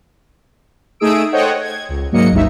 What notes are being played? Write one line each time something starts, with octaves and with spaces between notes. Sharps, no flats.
A3 D#4 G#4 D#6 E6 D7
A4 C5 C#5 D#5 F#5 G5
G#6
C#2
G#2 F#3 A#3 D#5 C#7
G1 C#2 G2 G#3 D#4 E5